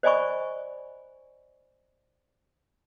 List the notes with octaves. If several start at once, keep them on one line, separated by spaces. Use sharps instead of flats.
C5 D5 D#5 G#5 B5 C#6